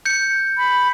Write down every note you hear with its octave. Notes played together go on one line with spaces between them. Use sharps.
G6 C#7
B5